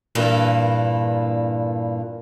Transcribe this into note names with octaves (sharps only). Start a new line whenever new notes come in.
G2 A#2 E3 A#3 D4 A4